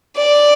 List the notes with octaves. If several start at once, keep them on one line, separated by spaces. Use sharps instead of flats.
D5